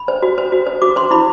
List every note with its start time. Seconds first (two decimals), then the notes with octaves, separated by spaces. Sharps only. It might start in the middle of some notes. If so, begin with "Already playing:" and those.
Already playing: B5
0.08 C5
0.22 F#4
0.38 C5
0.52 F#4
0.66 C5
0.82 F#4 D6
0.96 C5 C6
1.11 E4 B5